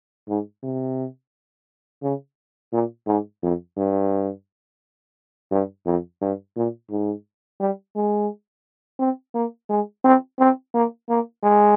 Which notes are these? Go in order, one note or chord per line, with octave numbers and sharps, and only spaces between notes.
G#2
C3
C#3
A#2
G#2
F2
G2
G2
F2
G2
A#2
G#2
G3
G#3
C4
A#3
G#3
C4
C4
A#3
A#3
G#3